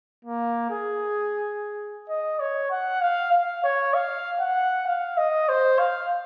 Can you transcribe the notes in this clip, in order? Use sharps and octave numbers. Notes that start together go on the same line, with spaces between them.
A#3
G#4
D#5
C#5
F#5
F5
F5
C#5
F5
F#5
F5
D#5
C5
F5